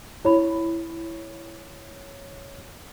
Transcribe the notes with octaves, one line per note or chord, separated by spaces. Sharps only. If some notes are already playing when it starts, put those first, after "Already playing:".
E4 C#5 B5